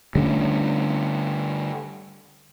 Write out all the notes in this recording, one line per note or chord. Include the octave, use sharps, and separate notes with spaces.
D3 G3 A3 C#4